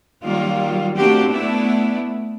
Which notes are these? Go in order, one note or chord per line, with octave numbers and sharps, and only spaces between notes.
D#3 F#3 G3 A#3 F4
A3 A#3 C4 D4 F#4 G4
A3 B3 D4 E4